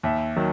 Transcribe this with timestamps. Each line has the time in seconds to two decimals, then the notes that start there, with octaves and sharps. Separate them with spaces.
0.03 D#2 E5
0.36 D#3 F#3